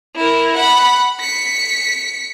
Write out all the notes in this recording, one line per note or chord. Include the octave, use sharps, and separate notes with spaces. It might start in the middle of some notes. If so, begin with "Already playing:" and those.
E4 A#4
F#5 B5
B6 C#7